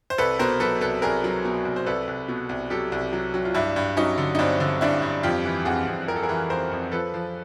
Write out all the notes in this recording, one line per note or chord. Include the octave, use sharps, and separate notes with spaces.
C5
C2 A4 B4
B2 A#4 C5
F#3 A4 B4
C2 A4 B4
C2 G#4 A#4
F#3
B2
C2
C5
C2 A4 B4
C2
B2
C2
F#3 G4 A4
C2
F#3
F#3
F4
G2 D4 E4
G2
F#3 C#4 D#4
D3
D#4
G2 C4 D4
D3
G2 D4 E4
G2
F2 F4 G4
E3
F2 F#4 G#4
F2
F2 A#4
A4
G#4 A#4
E3
F2 A#4 C5
F2
F3 A4 B4
F3